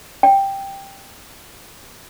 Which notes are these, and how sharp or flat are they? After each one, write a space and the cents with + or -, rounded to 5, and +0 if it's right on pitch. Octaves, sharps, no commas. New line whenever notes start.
G5 +5